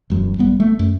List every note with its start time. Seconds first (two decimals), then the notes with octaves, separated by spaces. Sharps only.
0.10 E1 F#2
0.38 G#1 G3 B3
0.60 A3
0.79 F#2